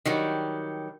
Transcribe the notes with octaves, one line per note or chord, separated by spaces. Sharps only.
D#3 F#3 G3